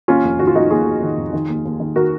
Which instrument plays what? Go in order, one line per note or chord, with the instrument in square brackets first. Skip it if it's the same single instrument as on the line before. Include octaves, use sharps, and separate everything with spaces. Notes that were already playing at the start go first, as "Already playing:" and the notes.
[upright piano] D#2 C#4 F4
F1
D#3 F#4
F4
F1 D#4 F#4
D#2 F4 G#4
F1
D#3
F1
D#3
D#2
D#2
D#3
D#3 F#4 A#4